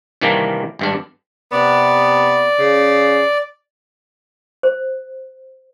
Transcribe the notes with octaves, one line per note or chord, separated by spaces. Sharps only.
G2 C3 D#3 E3 A#3 D4
G#1 G2 D4
C3 B3 D5
C#3
C5